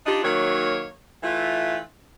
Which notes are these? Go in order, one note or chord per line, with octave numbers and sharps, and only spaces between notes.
D4 D#4 F4 G4
D#3 F#3 A#3 C#5
E3 A3 F4